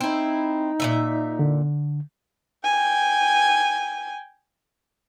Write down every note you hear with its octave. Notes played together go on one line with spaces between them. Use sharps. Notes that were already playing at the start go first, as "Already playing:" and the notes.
C4 D#4 E4
A#2 E3 E5
D3
G5 G#5